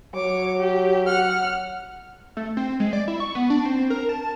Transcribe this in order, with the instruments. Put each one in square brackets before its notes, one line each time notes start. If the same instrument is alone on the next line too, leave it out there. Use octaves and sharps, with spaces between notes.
[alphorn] F#3 [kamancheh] C#5 D6
[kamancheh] G4
F#5 F6
[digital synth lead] A3
C4
G#3
D5
E4
C#6
B3
D4
C4
A#4
A5